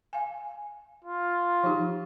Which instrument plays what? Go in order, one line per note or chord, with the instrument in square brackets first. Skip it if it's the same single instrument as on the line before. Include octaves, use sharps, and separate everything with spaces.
[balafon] F5 G#5
[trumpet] F4
[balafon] F3 D#4 G4